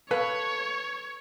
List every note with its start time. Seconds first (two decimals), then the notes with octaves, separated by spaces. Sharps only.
0.11 A4 B4 C#5 F5